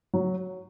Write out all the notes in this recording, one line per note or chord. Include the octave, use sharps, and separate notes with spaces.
F#3